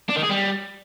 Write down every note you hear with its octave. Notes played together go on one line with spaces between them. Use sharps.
D4
D#3
G#4
G3